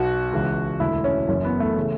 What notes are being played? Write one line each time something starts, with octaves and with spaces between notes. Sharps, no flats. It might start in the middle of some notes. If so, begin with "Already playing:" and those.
Already playing: B1 B2 F#4
C#2 C#3 E3
E1 D2 D3 E4
C#4
F#1 F#2 E3 C#4
B3
A3
C#3 E3